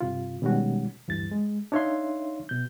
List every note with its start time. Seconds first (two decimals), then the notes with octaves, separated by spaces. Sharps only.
0.01 G2 C3 F4
0.42 B2 D#3 G3 G#3 C#4 F#4
1.08 D2 G2 E3 A6
1.31 G#3
1.72 D4 D#4 C#5 E5 F5 C6
2.49 B2 G6